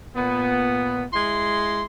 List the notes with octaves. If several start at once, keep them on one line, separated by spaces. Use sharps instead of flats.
A#2 B3
G#3 E4 C6